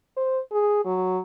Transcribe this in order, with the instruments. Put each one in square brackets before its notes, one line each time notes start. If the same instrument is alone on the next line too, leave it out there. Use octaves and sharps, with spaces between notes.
[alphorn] C5
G#4
F#3